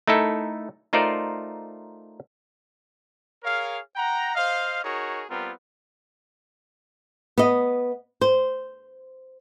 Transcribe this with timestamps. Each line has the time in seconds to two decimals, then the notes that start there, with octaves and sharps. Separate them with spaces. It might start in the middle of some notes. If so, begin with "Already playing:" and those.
0.08 A3 D#4 E4 A4 A#4
0.93 A3 D#4 F4 A#4 C5 D5
3.43 G#4 A#4 C#5 F5
3.96 F#5 G5 A#5
4.35 C5 D#5 F5
4.83 D#4 F#4 G#4 A#4 C#5
5.28 G3 B3 C4 F4 A#4
7.38 B3 D#5
8.21 C5